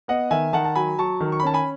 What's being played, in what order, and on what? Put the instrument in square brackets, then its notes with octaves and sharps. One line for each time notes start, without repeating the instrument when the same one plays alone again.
[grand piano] B3 D#5 F#5
D#3 E5 G#5
D#3 F#5 A5
A5
F#3 G#5 B5
F#3 A5 C#6
D#3
C#6
B5
C#4 A5
G#5 B5